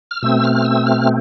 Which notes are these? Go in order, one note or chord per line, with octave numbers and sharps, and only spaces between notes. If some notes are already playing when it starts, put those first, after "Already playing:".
F6
B2 A3 C4 E6
F6
E6
F6